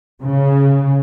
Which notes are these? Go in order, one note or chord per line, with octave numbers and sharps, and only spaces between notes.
C#3